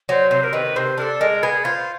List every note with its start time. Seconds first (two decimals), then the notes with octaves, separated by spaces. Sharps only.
0.09 F#3 C5
0.31 C3 C5
0.44 A#4
0.53 D#3 B4
0.76 C3 C5
0.98 D4 A#4
1.02 A4
1.21 G#3 A#4
1.43 B3 G#4
1.65 F4 C5